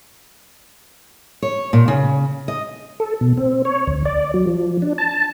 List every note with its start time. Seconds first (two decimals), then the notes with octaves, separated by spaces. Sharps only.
1.42 C#5
1.73 A#2
1.88 C#3
2.48 D#5
3.00 A4
3.21 B2
3.37 C4
3.65 C#5
3.87 D2
4.05 D5
4.34 F#3
4.47 F3
4.82 D4
4.98 A5